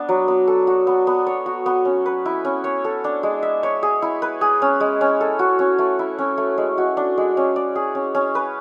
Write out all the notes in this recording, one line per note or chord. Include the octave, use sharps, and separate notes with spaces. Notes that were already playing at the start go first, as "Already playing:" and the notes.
Already playing: B3 D4
F#3
B3
A4
F#4
B3
B3
C#5
F#4
B3
C#4
B4
E4
C#4
C#5
A4
D4
G#3
E5
C#5
G#4
E4
B4
G#4
C#4
G#3
C#4
A4
F#4
C#4
A3
E4
C#4
A3
G#3
F#4
D4
G#3
C#4
D5
G#4
C#4
C#4
B4